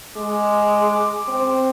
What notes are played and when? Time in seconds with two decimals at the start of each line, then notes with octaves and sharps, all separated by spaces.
0.17 G#3 D6
1.28 C4